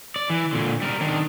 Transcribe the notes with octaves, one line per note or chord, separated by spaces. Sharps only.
D5
E3
A#2 D3
G3 A#4
D#3 D4